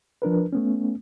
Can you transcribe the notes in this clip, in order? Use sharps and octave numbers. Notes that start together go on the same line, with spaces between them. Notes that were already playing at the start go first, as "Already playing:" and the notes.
F3 D4 A#4 B4
A3 B3 C#4